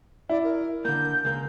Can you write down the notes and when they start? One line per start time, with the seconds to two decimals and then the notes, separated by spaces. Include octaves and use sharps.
0.29 E4 D5
0.44 A#4
0.85 D3 A#3 G6
1.25 C#2 A#3 G6